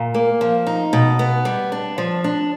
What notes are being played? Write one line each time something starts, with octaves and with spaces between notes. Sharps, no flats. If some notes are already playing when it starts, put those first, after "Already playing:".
Already playing: A#2
A#3
F3
D#4
B2
B3
G3
D4
F3
D4